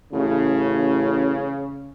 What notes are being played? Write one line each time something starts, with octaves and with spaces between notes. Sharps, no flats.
A1 C#3